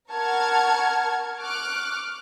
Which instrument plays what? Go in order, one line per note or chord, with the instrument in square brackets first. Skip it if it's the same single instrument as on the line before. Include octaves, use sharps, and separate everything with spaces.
[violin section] A#4 F#5 A5 C#6 F6 G#6
C#6 D6 F6 F#6